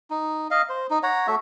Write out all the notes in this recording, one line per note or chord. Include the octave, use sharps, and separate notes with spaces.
D#4
D#5 F5
C5
D#4
C#5 F#5 A#5
A3 F#4 E5